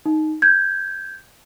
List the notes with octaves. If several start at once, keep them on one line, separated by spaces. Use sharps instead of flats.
D#4
G6 G#6